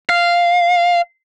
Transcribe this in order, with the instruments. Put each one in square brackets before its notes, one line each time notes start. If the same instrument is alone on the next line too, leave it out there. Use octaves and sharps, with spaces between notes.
[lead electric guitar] F5